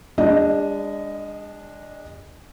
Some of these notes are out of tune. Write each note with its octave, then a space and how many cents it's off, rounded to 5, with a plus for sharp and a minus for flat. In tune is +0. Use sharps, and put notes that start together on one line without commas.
G#3 -40 D4 -5 D#5 +0